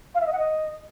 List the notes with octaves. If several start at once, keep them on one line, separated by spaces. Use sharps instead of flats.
F5
E5
D#5
F#5
D#5